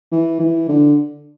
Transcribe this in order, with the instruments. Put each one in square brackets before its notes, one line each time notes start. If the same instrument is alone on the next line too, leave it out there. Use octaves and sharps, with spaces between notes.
[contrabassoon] E3
E3
D3